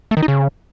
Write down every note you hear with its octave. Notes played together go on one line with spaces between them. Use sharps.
A3
D#3
D#4
C#3